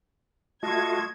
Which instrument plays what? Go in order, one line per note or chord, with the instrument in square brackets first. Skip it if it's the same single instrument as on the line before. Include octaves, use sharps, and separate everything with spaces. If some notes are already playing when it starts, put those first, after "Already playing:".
[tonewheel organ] A3 F4 F#4 [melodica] D#5 A5 [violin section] G#6